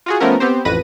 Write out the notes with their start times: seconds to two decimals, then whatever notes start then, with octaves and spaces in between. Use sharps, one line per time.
0.06 F4 F#4 G#4
0.20 F3 A3 B3 C#4 A#4
0.40 B3 C4 G4 C5
0.65 A1 F2 B4 A#6 D#7